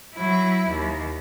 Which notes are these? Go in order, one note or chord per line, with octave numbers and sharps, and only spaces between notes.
F#3 E4
D#2